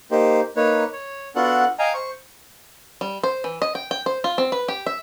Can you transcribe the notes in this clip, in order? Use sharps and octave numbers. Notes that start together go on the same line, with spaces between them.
A#3 D#4 G4 C5
A#3 D#4 B4 C#5
C#5
B3 D4 F4 F#4 A4 F#5
D#5 F5 G5 G#5 A#5
C5 C#6
G3
C5
E3
D#5
G5
G5
C5
F4
C4
B4
G4
E5